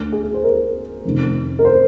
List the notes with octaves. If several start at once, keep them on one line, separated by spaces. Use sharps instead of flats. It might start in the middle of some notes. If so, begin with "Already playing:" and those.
Already playing: D2 D3
G#4
C5
A#4
F1 F2 C3 D#3
A#4
C5